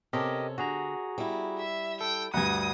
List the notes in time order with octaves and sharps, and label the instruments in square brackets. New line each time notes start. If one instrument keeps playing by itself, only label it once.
[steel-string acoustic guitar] C3 C#4 A4 [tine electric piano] G4 A#4 D#5
[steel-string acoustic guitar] D3 [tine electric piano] F#4 G#4 A#5
[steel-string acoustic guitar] G3 E4
[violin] E5
[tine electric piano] A4 [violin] G5
[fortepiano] D2 G2 [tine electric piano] F#5 G#6 [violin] D#6